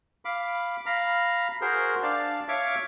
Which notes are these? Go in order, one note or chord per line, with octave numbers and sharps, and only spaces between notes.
F5 B5 D6
F5 A#5 B5
F#4 G#4 A#4 C5 C6
D4 D5 F5 A5
C#5 E5 F5 C#6 D6